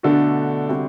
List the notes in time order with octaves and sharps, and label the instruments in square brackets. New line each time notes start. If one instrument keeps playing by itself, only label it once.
[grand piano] B2 A3 D4 F#4 A4 [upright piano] D3
[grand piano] C3 G3 C4 F#4